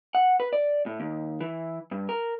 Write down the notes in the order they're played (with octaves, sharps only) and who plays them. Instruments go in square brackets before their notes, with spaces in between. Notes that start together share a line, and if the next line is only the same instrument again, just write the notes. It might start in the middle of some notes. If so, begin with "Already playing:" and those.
[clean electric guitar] F#5
B4
D5
A2
D#2
E3
G2
A#4